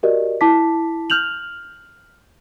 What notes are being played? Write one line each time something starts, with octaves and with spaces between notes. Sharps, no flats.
F#4 G4 A#4 D5 D#5
E4 A5 D6 B6
F6 G6 F7 F#7